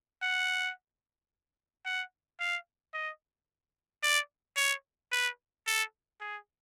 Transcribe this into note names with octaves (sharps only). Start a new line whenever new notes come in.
F#5
F#5
F5
D#5
D5
C#5
B4
A4
G#4